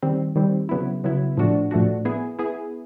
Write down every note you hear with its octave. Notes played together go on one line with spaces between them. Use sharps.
D#3 G3 C4
D#3 G3 C4
C#3 F#3 B3 E4
C#3 F#3 B3 E4
A2 F3 A3 D4 F#4
A2 F3 A3 D4 F#4
B3 E4 G#4
B3 E4 G#4